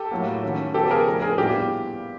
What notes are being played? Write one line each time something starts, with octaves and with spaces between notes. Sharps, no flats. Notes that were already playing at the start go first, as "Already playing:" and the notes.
Already playing: G4 A4
A2 F#3 A#3
D#3 F#3 A3 C#4
C#3 F3 G#3 B3 G4 A4
G#4 A#4
F3 A3 D4
G#4 A#4
A#2 G3 B3 E4 G4